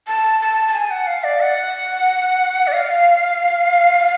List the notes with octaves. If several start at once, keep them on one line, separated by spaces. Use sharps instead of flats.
A5
A5
A5
G#5
F#5
F5
D5
F#5
D5
F5